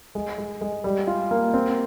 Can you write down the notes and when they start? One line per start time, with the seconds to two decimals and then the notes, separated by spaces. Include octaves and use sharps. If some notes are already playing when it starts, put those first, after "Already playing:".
0.15 G#3
0.38 G#3
0.61 G#3
0.84 G3
1.07 F4
1.31 A#3
1.54 C4